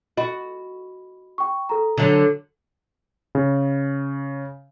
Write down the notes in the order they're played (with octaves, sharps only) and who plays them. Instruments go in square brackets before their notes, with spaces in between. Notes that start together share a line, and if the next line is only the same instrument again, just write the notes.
[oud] F#4 [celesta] D#5 B5
[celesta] G5 C#6
A4 A#5
[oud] D3 F#3
[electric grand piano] C#3